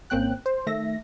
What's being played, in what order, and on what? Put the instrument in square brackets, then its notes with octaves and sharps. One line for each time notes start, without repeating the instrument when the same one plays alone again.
[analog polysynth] G#1 A#3 C4 C#4 G5 F#6
C5
D#3 A3 E5 A#6